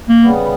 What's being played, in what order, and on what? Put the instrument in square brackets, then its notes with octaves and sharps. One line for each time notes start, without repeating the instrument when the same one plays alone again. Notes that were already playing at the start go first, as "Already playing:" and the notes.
[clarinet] A#3
[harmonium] C#3 G3 B3